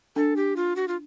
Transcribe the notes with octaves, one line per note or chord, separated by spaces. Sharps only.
D4 A4
G4
F4
F#4
F4